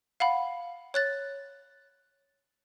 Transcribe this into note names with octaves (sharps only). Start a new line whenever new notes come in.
F5 F#5 B5
C#5 F#6 A6